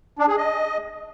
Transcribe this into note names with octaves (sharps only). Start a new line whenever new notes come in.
D4
G#4
D#5